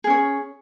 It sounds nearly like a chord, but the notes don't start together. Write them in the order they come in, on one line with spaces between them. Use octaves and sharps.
G#4 C#4 C#5